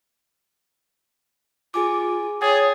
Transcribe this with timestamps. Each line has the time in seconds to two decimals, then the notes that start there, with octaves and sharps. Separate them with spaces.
1.74 F4 G#4 G#5 D6
2.42 G#4 C#5 G5 G#6 A6